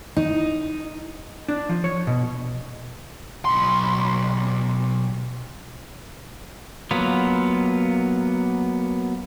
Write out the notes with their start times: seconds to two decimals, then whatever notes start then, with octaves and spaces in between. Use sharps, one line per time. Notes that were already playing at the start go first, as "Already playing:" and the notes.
0.16 D#4
1.48 D4
1.69 F3
1.84 C#5
2.07 B2
3.45 B1 C6
6.91 F#3 A#3 B3 F4